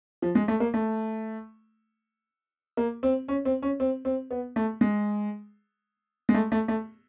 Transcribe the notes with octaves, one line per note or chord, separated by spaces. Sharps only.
F3
G#3
A3
A#3
A3
A#3
C4
C#4
C4
C#4
C4
C4
B3
A3
G#3
G#3
A3
A3
A3